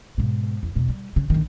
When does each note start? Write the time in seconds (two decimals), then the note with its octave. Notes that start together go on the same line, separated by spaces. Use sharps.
0.18 G#2 B2
0.63 E2
0.75 E2 B2
0.89 G3
1.16 C#3
1.30 A#1 D#3